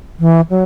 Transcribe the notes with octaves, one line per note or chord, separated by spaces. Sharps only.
E3
F#3